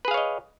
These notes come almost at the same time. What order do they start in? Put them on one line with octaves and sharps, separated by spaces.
B4 G#4 F5 C#5 D#5